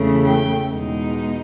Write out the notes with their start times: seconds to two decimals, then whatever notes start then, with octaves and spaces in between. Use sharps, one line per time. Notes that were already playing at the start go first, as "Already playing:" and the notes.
Already playing: E2 C#3 E3 A3
0.25 G5
0.73 E2 B2 G#3 B3 D#4